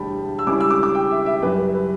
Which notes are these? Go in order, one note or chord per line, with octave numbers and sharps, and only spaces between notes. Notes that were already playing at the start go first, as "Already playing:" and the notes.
Already playing: E1 D2 D3 G3 G5 A5 B5
E6
C#2 C#3 G3 C#4 E4 D6
E6
D6
D6
G5
E5
E5
F#2 C#3 G3 B4
B4
B4